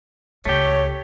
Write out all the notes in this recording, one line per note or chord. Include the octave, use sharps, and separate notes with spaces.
C#2 A3 G4 C#5